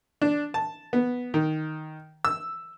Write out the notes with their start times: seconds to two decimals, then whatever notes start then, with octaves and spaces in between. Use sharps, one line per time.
0.22 D4
0.54 A5
0.93 B3
1.34 D#3
2.25 E6